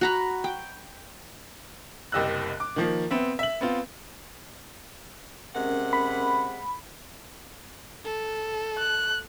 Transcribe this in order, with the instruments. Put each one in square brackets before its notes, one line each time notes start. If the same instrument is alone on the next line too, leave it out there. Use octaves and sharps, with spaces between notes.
[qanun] F#4 A#5 B5
G5
[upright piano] F#1 C2 G4 D#5 E6 F#6
D6
D#3 F3 A#3
B3 C4 E5
E5 F#7
B3 C4 F4
[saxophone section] C3 G#3 F#5 [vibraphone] C#4 A#4
[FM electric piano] B5
[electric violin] A4
[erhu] F#6